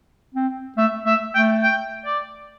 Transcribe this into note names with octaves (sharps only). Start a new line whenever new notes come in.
C4
A3 E5
A3 E5
A3 G5
G5
D5